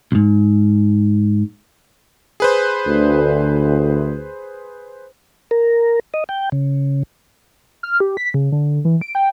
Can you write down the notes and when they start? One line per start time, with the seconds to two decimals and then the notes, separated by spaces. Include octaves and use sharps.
0.12 C2 G#2
2.40 G#4 B4 C5
2.88 D2
5.51 A#4
6.14 D#5
6.29 G5
6.52 C#3
7.83 F6
8.00 G4
8.17 B6
8.34 C#3
8.52 D3
8.85 E3
9.01 D7
9.15 G5